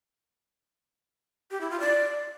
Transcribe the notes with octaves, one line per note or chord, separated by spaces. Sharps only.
G4
E4
F4
D5